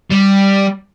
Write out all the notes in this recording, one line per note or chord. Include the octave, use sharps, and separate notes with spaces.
G3